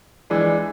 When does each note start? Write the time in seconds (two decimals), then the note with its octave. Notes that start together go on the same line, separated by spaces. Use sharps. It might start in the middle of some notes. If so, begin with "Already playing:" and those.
0.30 E3 G#3 D4